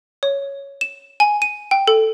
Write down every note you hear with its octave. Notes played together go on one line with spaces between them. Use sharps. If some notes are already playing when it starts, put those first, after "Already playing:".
C#5
E7
G#5
D#7
G5
A4